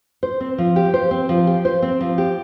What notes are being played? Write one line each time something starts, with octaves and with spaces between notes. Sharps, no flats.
C5
C4
F3
G4
C5
C4
F3
G4
C5
C4
F3
G4